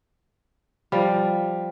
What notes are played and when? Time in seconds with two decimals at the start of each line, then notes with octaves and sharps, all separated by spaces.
0.92 F3 G3